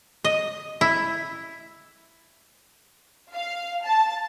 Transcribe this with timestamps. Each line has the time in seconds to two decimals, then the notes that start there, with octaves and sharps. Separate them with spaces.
0.25 D#5
0.81 E4
3.34 F5
3.85 A5